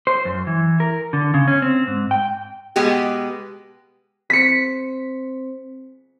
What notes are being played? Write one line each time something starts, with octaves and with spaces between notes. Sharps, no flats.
C5
F#2
E3
A#4
D3
C#3
C#4
C4
G#2
G5
B2 G#3 B3 G4
C4 C5 B6 C#7